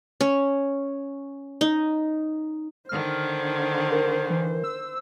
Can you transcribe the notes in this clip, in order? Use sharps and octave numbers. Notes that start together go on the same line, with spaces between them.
C#4
D#4
D3 D#3 C5 F6
A#4
E3
E6